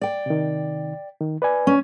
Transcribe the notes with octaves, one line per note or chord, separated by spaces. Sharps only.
D5 G5
C3 D#3
D#3
B4 D5 G#5
C#4